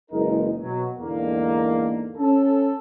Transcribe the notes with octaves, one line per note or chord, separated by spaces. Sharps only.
F#1 E3 G#3 D#4 A#4
B2 F#3
E2 G#2 D3 A#3
C#4 A4